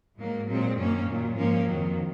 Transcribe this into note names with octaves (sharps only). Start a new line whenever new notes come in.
G#2 F#3 A#3
A#2 F#3 G#3 C4
F#2 D#3 F#3 A#3 C#4
A#2 F#3
G#2 F3 A#3 C#4
F2 D#3 F#3